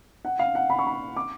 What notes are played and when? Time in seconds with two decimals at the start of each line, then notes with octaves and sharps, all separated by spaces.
0.25 F#5
0.39 F5
0.55 F#5
0.70 B5
0.79 C#6
0.87 B5
1.16 D6